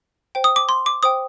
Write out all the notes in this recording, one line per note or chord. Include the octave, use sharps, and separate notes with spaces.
C5 G5
D#6
D6
C6
D6
C5 G5 D#6